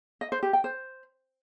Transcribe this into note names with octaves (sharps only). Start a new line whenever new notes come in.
D#5
C5
G4
G5
C5